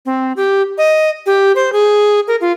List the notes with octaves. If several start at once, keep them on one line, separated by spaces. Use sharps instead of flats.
C4
G4
D#5
G4
C5
G#4
A#4
F4